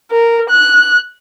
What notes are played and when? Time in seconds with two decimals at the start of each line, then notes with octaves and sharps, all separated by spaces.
0.11 A#4
0.49 F#6